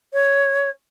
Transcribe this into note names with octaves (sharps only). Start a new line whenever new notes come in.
C#5